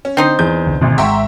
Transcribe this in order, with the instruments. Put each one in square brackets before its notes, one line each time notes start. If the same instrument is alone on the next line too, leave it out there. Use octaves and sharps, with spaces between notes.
[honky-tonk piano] C#4
[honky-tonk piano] D3 [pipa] C4 D#4 C5
[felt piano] E2 [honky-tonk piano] G6
[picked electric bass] C2 D3 E3
[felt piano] G#1 D2 [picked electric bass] B2 A3
[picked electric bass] G#1 G#3 [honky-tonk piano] E5 A#5 C6 [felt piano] F#5 G5 C#6